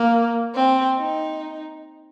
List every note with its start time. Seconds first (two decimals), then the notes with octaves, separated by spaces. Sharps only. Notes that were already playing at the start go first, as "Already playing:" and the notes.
Already playing: A#3
0.55 C4
0.98 D#4